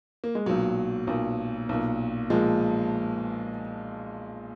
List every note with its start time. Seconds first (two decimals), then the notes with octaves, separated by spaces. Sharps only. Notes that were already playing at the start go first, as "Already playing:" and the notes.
0.24 A#3
0.35 G#3
0.46 B1 A#2 F#3
1.07 B1 A#2
1.69 B1 A#2
2.30 A#2 F3 G#3